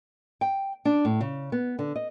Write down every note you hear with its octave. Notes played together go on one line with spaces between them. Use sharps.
G5
D4
A2
C#3
B3
D3
D#5